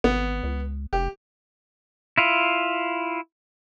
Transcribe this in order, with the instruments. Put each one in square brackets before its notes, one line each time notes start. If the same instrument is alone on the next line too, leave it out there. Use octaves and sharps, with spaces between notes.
[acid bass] G#1 [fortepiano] B3
[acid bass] C#2
[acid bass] F1 [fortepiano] G4
[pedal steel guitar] E4 F4